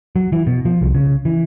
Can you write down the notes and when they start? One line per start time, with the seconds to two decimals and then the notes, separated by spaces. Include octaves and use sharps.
0.16 F#3
0.32 E3
0.47 B2
0.65 F3
0.81 C2
0.95 C#3
1.25 E3